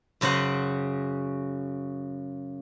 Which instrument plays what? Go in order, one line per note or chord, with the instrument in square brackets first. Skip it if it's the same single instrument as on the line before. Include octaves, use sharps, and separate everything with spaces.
[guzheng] F#2 C#3 F#4 C5 F#5